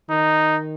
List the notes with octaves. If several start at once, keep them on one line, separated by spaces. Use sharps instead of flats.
D#3 D#4